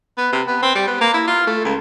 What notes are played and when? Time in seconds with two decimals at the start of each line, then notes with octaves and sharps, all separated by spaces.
0.17 B3
0.32 C3
0.47 B3
0.62 C4
0.75 G3
0.87 B3
1.01 A#3
1.14 E4
1.27 F4
1.47 A3
1.65 C#2